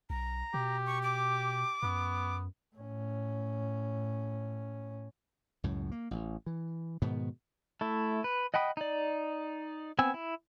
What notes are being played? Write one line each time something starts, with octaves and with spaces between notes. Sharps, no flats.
B1 A#5
B2 G4
C#6
D6
F#2 B3
A2 C#4
C#2 F#2 A2
A#3
A1
E3
G#2 B2 D#3 B3
A3 E4
B4
D#5 F#5 G5 B5 D#6
D#4 D5
B3 C4 G#5 E6
E4